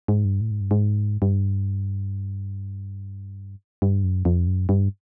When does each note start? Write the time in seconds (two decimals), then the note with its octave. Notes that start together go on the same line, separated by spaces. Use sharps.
0.08 G#2
0.25 G2
0.41 A2
0.51 G#2
0.61 G2
0.71 G#2
1.22 G2
3.82 G2
4.04 F#2
4.25 F2
4.47 F#2
4.69 G2